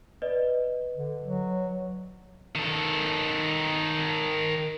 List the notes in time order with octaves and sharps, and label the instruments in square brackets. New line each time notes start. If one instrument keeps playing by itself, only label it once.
[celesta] B4 D5 D#5
[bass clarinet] D3
F#3
[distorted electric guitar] D#3 A4